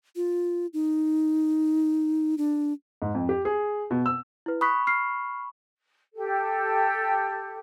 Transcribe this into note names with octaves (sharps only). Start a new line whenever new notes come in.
F4
D#4
D4
G#2
F2
G4
G#4
B2
E6
E4 B4
B5 C#6 D#6 F#6 B6
F6 C7
G4 A4